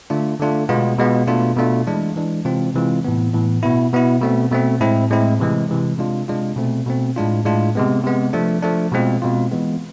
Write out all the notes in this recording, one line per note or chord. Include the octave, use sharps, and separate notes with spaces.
D3 A3 D4 F4
D3 A3 D4 F4
B2 G#3 B3 F4
B2 G#3 B3 F4
B2 A3 D4 F4
B2 A3 D4 F4
E3 G#3 D4
E3 G#3 D4
C3 E3 G#3 C4 F4
C3 E3 G#3 C4 F4
A2 E3 B3
A2 E3 B3
B2 B3 E4
B2 B3 E4
B2 A3 C4
B2 A3 C4
A2 G#3 C4 E4
A2 G#3 C4 E4
C3 E3 G#3
C3 E3 G#3
C3 G#3 D4 F4
C3 G#3 D4 F4
B2 A3 C4
B2 A3 C4
A2 G#3 D4 F4
A2 G#3 D4 F4
C3 G#3 B3
C3 G#3 B3
F3 A3 D4
F3 A3 D4
B2 G#3 C4 F4
B2 G#3 C4 F4
E3 G#3 B3